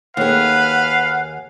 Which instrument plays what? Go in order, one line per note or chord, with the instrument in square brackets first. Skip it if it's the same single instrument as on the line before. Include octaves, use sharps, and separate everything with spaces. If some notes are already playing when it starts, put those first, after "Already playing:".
[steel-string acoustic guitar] D#2 G#4 [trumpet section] B4 F5 [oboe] F#5